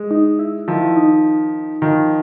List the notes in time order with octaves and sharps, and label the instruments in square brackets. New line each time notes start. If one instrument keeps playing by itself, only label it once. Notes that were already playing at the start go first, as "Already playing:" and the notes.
Already playing: [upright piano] G#3
[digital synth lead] D#4
E4
[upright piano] D#3 F3 [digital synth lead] E4
[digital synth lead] D#4
[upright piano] D#3 F3